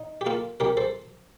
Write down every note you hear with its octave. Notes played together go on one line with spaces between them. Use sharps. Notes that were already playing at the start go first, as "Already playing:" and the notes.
Already playing: D#4
G4
A#3 F4 A4
C2 G4 A#4
A4 C5